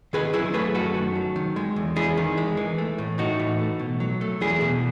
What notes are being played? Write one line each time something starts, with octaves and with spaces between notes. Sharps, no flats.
D#3 G#4 B4
F#3 E4 G#4
A3 G#4 B4
F#2 F#4 A4
D#3
F#3
D#3
G#3
E2
E2 E4 G#4
D#3
G#3
E3
A3
A2
A2 D#4 F#4
E3
A3
B2
F#3
A3
E2 E4 G#4
B2